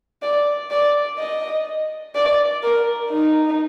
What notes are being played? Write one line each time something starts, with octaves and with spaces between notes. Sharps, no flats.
D5
D5
D#5
D5
A#4
D#4